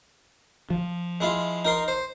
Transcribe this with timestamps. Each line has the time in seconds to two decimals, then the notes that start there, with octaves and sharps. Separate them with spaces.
0.70 F3
1.21 G#3 E4 F4
1.65 D#4 A#4 C6
1.88 C5